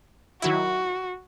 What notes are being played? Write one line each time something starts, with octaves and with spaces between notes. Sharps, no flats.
D#3 F#3 E4 F#4